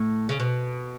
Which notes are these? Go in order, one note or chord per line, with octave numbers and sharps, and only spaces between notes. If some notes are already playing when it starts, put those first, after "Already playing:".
Already playing: A2
C#3
B2